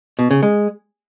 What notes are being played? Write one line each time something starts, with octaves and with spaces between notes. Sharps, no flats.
B2
C#3
G#3